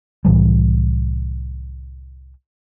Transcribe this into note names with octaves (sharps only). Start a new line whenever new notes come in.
C2 A2 E3 G3